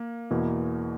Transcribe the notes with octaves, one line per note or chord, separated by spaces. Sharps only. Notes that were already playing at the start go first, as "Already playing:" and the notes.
Already playing: A#3
E2 B2 A#3 E4